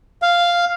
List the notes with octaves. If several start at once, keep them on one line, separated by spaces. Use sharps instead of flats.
F5